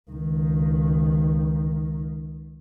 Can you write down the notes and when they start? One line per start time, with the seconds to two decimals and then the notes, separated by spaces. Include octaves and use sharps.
0.10 C#2 D#3